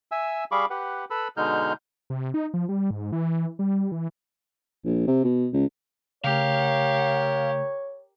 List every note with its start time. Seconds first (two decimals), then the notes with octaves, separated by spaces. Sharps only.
0.12 E5 G#5 E6
0.52 G3 G#4 F5 B5 C#6 D6
0.70 G4 B4 F#5
1.10 A4 B4 B5 E6
1.37 B2 D3 G#3 D#4 F6 G6
2.10 C3
2.34 D#4
2.54 F3
2.69 G3
2.91 G#2
3.12 E3
3.59 G3
3.92 E3
4.85 A#1
5.07 C3
5.24 B2
5.53 C#2
6.24 C#3 A3 G4 A#4 C#5 F5